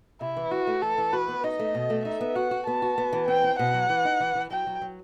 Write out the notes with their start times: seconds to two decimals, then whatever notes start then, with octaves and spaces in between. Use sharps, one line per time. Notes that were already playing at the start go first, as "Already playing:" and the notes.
0.21 C3 E4
0.36 E3
0.51 E4 F#4
0.67 A3
0.82 E3 A4
0.98 E3
1.13 F#4 B4
1.28 B3
1.44 D#4 D#5
1.59 A3
1.75 B2
1.90 A3
2.05 D#4 E5
2.21 B3
2.35 F#4 F#5
2.51 F#4
2.67 B3 A5
2.82 F#4
2.98 B3
3.13 E3
3.28 C4 G5
3.43 C4
3.59 B2 F#5
3.74 F#3
3.89 E3
4.05 D#4
4.20 E3
4.35 E3
4.50 F#3 G5
4.67 F#3
4.82 F#3